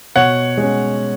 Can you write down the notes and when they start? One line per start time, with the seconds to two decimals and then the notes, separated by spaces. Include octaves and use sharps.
0.16 B2 C#5 F#5
0.57 G#3
0.63 C#4